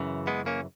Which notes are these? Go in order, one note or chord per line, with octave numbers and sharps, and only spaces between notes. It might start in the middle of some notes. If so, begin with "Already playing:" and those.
Already playing: F#2 C#3 E3
G#3 B3
A#3 C#4